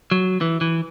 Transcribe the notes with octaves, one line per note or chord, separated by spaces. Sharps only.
F#3
E3
E3